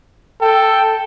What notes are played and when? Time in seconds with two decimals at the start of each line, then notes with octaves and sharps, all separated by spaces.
0.41 A4 G5